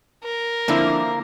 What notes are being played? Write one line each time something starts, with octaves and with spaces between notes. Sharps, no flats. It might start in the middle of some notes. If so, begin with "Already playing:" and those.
A#4
D3 F3 A#3 C4 E4 A#5